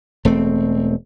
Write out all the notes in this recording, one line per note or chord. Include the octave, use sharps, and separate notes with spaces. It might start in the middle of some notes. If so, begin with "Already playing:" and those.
E1 A3 C4